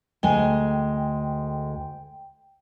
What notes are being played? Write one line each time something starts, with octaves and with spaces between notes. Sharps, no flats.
D2 G#3 G5 G#5